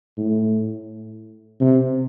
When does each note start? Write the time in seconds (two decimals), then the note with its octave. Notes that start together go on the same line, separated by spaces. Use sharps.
0.18 A2
1.61 C3